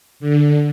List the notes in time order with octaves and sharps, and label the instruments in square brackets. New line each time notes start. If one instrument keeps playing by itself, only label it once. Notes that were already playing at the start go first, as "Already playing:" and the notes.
[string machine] D3